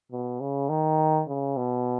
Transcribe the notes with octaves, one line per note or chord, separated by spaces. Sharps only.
B2
C#3
D#3
C#3
B2